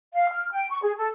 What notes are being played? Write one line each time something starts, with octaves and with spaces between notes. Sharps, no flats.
F5
F6
G5
C#6
G#4
A4